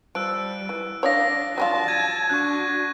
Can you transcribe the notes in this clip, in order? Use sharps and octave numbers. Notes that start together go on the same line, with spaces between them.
F3 G3 E6 F#6 D7
E3
D4 C#5 D5 F5 D#6 A#6
F#3 G3 F4 A5
G#6 D#7
D4 F#4 C#6 F#6